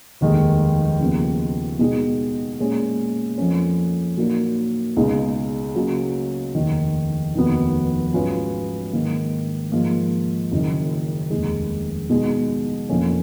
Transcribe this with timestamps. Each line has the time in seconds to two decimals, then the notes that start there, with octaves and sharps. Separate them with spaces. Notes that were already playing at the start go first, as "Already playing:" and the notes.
0.21 F1 D#2 D#3 G#3
1.01 D#2 C#3 F3 B3
1.79 B2 G#3 D#4 G#4
2.59 A#2 G#3 C#4
3.38 F2 F3 A#3 C#4
4.17 A#2 F#3 A#3 D#4 A#4
4.97 C#2 B2 G#3 D#4
5.75 C#3 F#3 A#3 C#4
6.55 F1 D#2 D#3
7.34 F1 D#2 D#3 F#3 B3
8.14 G#2 F#3 C#4 F4 B4
8.93 G#2 D#3 A#3
9.72 G#2 F3 A#3
10.52 F#1 F#2 D#3
11.30 F1 D#2 D#3 G#3
12.10 B2 G#3 D#4
12.89 F1 F2 F3 A#3 C#4